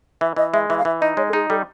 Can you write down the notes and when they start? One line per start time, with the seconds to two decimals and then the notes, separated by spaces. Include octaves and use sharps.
0.21 E3 E5
0.36 E3 D#5
0.53 G#3 E5
0.69 E3 E5
0.78 F5
0.85 E3 E5
1.01 D#4 D#5
1.17 G#3 C#5
1.29 A4
1.33 D#4 G#4
1.50 G3 A4